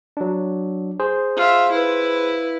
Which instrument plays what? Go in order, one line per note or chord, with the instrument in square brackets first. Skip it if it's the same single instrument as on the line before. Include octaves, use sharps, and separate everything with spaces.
[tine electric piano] F#3 D4
G#4 C5
[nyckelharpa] F4 E5
E4 B4